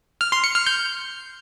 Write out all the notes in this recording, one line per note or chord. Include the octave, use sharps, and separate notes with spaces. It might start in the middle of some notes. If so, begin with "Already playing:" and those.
F6
C6
C#7
F6
G6